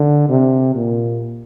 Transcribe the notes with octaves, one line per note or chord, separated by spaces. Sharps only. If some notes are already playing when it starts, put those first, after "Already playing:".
Already playing: D3
C3
A#2